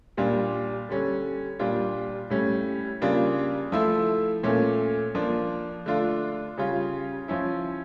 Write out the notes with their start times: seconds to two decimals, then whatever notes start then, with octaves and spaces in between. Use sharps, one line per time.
0.17 A#2 G3 D4 F4
0.89 D3 G3 C#4
1.59 A#2 G3 D4 F4
2.30 A2 G3 C#4
3.01 C#3 G3 A#3 D4 F4
3.72 F3 A3 E4
4.43 A#2 A3 C#4
5.15 F3 A#3 D4
5.86 D3 A3 D4 F4
6.57 C#3 G3 C#4 F4
7.28 F3 C#4 E4